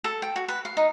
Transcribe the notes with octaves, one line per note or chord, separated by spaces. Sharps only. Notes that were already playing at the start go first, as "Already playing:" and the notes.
A4
G5
F#4
B4
F5
D#4